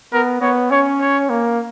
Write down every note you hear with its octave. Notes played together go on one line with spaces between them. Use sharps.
B3 A#4
B3 C#5
C#4 C#5
C#5
A#3